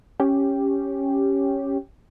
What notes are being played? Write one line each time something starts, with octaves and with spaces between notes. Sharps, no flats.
C#4 G4